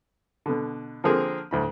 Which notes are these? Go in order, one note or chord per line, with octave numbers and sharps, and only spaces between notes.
B2 D3
D3 F3 A#3 C4 G#4 A#4
D2 A2 B5